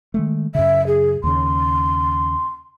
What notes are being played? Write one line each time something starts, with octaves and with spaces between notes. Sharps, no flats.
D#3 G#3 A3
F#2 C#3 E5
G#4
D#2 C#3 C6